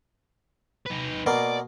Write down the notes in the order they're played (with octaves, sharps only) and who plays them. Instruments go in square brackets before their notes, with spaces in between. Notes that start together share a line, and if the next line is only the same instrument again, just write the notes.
[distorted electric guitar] D#4 B4
[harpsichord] B2 A#3 [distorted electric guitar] D5